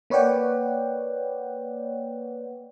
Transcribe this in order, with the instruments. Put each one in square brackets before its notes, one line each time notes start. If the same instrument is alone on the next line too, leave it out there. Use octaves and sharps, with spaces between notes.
[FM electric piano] A#3 B4 C#5 D5 F#5 G5